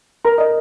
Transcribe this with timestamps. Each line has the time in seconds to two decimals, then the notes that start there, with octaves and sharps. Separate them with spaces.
0.25 A#4 A#5
0.38 D#5